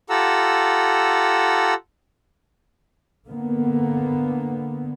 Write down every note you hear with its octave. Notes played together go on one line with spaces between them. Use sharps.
F4 G4 A4 F#5 A#5 E6
D3 A#3 B3